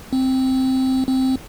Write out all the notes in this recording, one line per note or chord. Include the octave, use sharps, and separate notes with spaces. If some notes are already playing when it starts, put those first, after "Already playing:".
C4
C4